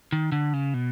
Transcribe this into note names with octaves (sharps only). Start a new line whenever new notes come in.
D#3
D3
C#3
B2